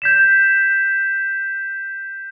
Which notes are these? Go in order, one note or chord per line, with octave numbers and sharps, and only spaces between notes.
G6 B6 E7